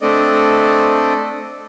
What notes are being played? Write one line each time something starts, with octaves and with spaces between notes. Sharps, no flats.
A3 C4 D4 A4 D5 D#5